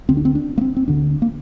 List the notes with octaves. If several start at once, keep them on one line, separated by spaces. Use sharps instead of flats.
D2 D3 C4
D4
C4
D4
A#3
C4
C4
D2 D3 D4
A#3